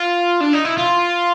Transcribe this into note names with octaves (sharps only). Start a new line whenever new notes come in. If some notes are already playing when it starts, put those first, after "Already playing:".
Already playing: F4
D4
D#4
E4
F4